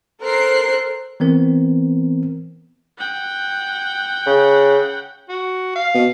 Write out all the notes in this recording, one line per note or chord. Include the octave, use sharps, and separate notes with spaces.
A4 A#4 C5 F#6 C7
E3 B3 C4 A#4
F#5 G5
C#3
F#4
F5
B2